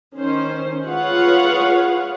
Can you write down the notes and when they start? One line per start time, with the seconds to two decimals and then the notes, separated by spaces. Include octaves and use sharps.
0.16 D#3 C#4 C5
0.85 F4 G#4 B4 C#5 F5 F#5